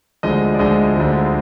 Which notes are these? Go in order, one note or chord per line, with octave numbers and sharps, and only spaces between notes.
D2 D3 F3 G#3 D#5
D5
D2 D3 F3 G#3 D#5
D2 D3 F3 G#3